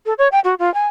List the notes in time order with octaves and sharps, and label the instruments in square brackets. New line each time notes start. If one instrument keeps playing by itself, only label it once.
[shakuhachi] A4
C#5
G5
F#4
F4
G#5